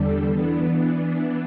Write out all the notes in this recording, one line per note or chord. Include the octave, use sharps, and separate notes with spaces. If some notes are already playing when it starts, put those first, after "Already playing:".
Already playing: E2 D3 G3 D4 A4
E3 B3 D4